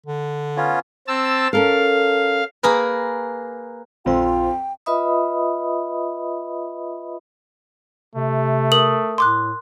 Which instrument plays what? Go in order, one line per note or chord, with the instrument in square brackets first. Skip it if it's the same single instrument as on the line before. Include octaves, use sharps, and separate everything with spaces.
[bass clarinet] D3
[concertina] B3 C#4 F4
[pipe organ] C4 A5 E6
[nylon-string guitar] C#4 A4 A#4 [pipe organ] F5
[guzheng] A#3 G#4 A#4 B4
[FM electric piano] A#1 C5 [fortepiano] F2 [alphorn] F4 [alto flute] G5
[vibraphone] F4 B4 D#5 E5 B5 D#6
[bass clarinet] C3 [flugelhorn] A3
[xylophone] A#4 D#6 F#7
[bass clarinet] A2 [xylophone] C6 D6 F#6